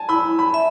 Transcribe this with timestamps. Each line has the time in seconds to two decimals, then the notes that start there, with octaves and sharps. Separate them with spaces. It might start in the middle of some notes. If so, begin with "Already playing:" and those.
Already playing: G#5 A5
0.09 E4 B5
0.39 B5
0.54 E5